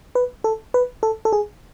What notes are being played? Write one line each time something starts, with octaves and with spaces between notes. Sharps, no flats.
B4
A4
B4
A4
A4
G#4